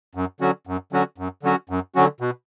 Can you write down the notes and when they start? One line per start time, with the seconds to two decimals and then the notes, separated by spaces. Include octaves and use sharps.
0.15 F#2
0.40 D3 F#3 C#4 F#4
0.67 F#2
0.93 D3 F#3 C#4 F#4
1.18 F#2
1.43 D3 F#3 C#4 F#4
1.70 F#2
1.95 D3 F#3 C#4 F#4
2.20 B2